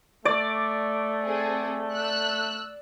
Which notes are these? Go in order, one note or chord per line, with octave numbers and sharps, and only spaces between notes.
A3 D5
C4 G#4 A4
E6 F#6